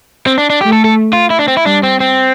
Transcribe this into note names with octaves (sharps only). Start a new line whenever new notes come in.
C4
D4
D4
A3 G4
A4
A4
F4
E4
D4
C4
E4
G3 D4
C4
C4